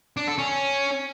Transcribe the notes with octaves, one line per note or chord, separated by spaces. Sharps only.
D4
A4
C#4